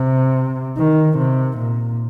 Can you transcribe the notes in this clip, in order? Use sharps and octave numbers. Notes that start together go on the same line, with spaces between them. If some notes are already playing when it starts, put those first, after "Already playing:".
Already playing: C3
D#3
C3
A#2